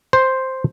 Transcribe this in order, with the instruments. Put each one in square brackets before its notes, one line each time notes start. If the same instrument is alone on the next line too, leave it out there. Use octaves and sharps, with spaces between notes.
[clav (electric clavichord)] C5